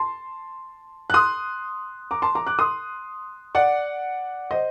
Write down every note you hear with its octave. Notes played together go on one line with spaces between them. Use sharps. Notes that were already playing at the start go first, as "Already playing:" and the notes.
Already playing: A5 C6
F#6
C6 D#6
A#5 D6
A5 C6
A#5 D6
D6 F#6
C6 D#6
D5 F#5
C5 D#5